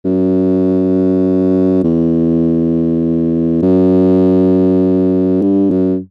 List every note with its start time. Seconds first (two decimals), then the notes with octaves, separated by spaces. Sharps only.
0.05 F#2
1.84 E2
3.63 F#2
5.42 G2
5.71 F#2